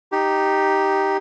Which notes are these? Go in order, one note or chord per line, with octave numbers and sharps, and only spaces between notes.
D#4 G4